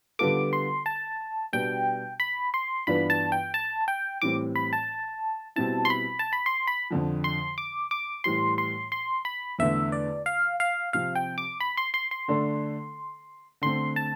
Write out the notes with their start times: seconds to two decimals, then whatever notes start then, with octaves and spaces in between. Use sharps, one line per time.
0.19 D3 G3 B3 F4 A4 D6
0.53 C6
0.86 A5
1.53 B2 G3 B3 D4 G5
2.20 B5
2.54 C6
2.87 G2 E3 B3 D4 F4 B5
3.10 A5
3.32 G5
3.54 A5
3.88 G5
4.22 A2 E3 G3 C4 D6
4.56 B5
4.73 A5
5.56 B2 G3 C4 E4 A5
5.85 C6
5.90 B5
6.19 A5
6.33 B5
6.46 C6
6.67 B5
6.90 F2 D3 F3
7.24 C6
7.58 D6
7.91 D6
8.24 A2 E3 G3 C6
8.58 C6
8.92 C6
9.25 B5
9.59 E2 D3 A3 E5
9.92 D5
10.26 F5
10.60 F5
10.93 C3 F3 C4 F5
11.15 G5
11.38 D6
11.60 B5
11.77 C6
11.94 C6
12.11 C6
12.28 D3 A3 D4 A4
13.62 D3 A3 C4 C6
13.96 A5